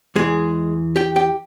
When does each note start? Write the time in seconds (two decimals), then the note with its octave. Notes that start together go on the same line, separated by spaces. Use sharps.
0.16 E2 E3 G#3 G#4
0.96 G4 G5
1.16 G4 G5